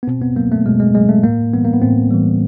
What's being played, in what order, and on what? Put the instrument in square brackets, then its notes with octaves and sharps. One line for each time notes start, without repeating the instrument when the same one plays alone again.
[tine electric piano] B3
B2 C4
B3
F#3 A#3
A3
B2 G#3
G#3
F#3 G#3
A3
A2 A#3
E3 G3 B3
A#3
B3
A2 C4
E3 G3